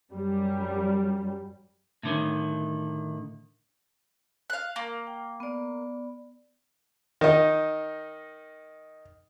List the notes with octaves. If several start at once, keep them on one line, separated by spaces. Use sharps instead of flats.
F#2 G3
A2 D3 D#3
F5 F#6
A#3
G5
B3 D5
D#3 D#4